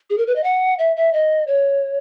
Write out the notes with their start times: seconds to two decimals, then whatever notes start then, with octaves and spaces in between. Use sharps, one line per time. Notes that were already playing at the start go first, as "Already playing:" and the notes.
0.10 G#4
0.18 A#4
0.27 B4
0.36 D#5
0.44 F#5
0.79 E5
0.96 E5
1.13 D#5
1.47 C#5